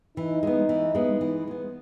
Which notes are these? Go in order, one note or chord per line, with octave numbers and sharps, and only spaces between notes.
E3 D#4
G#3 B3
E3
G#3 B3
E3
G#3 B3